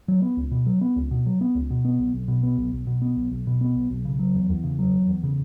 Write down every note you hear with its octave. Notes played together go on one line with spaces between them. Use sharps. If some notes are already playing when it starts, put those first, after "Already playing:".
F#3
B3
C#2
B2
F#3
B3
C#2
B2
F#3
B3
C#2
B2
B3
B1
B1
B2
B3
B1
B1
B2
B3
B1
B1
B2
B3
B1
B1
C#3
F#3
E2
E2
C#3
F#3
E2
E2
C#3